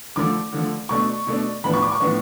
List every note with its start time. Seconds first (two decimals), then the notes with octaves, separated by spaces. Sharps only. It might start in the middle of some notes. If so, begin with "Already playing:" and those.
0.16 D3 F3 A3 D6
0.53 D3 F3 A3
0.89 B2 A3 D4 C#6
1.27 B2 A3 D4
1.64 A2 F3 B3 D4 B5
1.73 C#6
1.82 D6
1.92 C#6
2.00 A2 F3 B3 D4